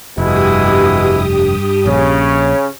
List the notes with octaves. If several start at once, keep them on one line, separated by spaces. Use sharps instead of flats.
F1 G2 B2 G#3 E4 G4 D#6
A#1 C#3 C#4